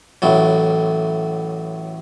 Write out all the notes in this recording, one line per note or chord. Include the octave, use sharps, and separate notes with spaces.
A1 A2 F#3